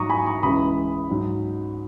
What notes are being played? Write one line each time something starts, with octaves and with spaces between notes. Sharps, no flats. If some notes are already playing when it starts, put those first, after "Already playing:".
Already playing: G#2 F#3 A#5 C#6 D#6
G#5 B5
A#5 C#6
C#2 C#3 E3 G#3 B5 D#6
G#2 F#3